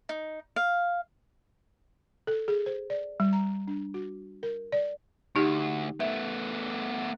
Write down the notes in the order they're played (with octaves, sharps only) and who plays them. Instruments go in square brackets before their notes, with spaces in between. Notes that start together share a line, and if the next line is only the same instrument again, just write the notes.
[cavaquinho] D#4
F5
[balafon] A4
G#4
C5
D5
G3
A#5
D4
F#4
A#4
D5
[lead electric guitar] D2 [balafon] D#4 G4
[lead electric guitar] A3 B3 [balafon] E5